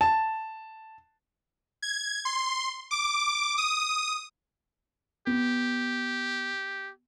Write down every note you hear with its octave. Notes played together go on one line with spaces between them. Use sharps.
A5
G#6
C6
D6
D#6
B3 G4